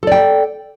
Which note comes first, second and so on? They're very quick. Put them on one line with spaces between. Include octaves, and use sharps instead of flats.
A4 D5 G5